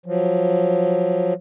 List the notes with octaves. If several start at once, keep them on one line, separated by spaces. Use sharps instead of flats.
F3 F#3